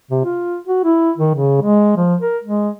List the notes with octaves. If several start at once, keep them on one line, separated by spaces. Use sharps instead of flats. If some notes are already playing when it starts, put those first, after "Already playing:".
C3
F4
F#4
E4
D#3
C#3
G#3
F3
A#4
G#3